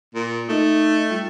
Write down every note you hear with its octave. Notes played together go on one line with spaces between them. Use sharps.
A#2
A3 D#4 D#5
G3 F4